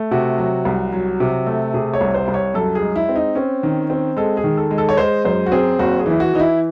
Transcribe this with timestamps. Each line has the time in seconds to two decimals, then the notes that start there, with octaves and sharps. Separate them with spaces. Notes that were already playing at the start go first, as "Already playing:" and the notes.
Already playing: A3
0.11 C3 F#4
0.38 F#3
0.65 C2
0.93 F#3
1.20 C3
1.46 A3
1.74 C3 G#4
1.94 C#5
2.01 C2
2.14 C5
2.28 C2
2.34 C#5
2.54 F#2 A4
2.75 G#4
2.82 G#3
2.96 E4
3.09 C4
3.16 D#4
3.35 C4 C#4
3.63 D#3
3.90 C4
4.17 G#3 A4
4.37 G#4
4.44 D#3
4.57 A4
4.71 G#3
4.78 A4
4.89 C#5
4.97 G#3 C5
5.25 F#2 C5
5.46 F#4
5.52 C4 G#4
5.79 F#1 F#4
5.99 G#4
6.06 E3 E4
6.20 F#4
6.33 E3 D#4
6.39 E4